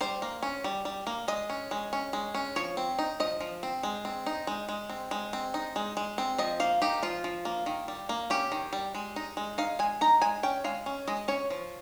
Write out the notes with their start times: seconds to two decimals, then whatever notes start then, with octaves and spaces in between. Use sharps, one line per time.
0.01 G3 C5
0.22 A#3
0.43 C#4
0.64 G3
0.85 G3
1.07 A#3
1.28 G#3 D#5
1.50 C#4
1.71 G#3
1.93 C#4
2.13 G#3
2.35 C#4
2.56 F3 C#5
2.77 C4
2.99 D#4
3.20 F3 D#5
3.41 F3
3.63 C4
3.83 G#3
4.05 C4
4.26 D#4
4.47 G#3
4.69 G#3
4.90 C4
5.11 G#3
5.33 C4
5.54 D#4
5.76 G#3
5.97 G#3
6.18 C4
6.38 F3 D#5
6.60 A#3 F5
6.82 D#4 G4
7.03 F3 F4
7.24 F3
7.45 A#3
7.66 D#3
7.88 G3
8.09 A#3
8.30 C#4 G4
8.52 D#3
8.73 G3
8.95 G#3
9.16 D#4
9.37 G#3
9.58 D#4 F5
9.79 G#3 G#5
10.01 D#4 A#5
10.22 G#3 G#5
10.43 C#4 G5
10.64 G#3 F5
10.86 C#4
11.08 G#3 D#5
11.28 C#4 C#5
11.50 F3